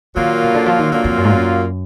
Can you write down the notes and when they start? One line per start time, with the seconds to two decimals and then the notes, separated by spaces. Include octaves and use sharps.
0.16 A#2 D#3 F#3 A#3 F4
0.44 B2
0.54 D3
0.66 F3
0.79 D#3
0.91 A#2 D3 F#3 A#3 F4
1.04 F2
1.17 F#2
1.24 G#2
1.31 F#2